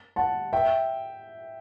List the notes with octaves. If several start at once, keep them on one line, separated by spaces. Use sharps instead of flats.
F#5 A5
E5 G5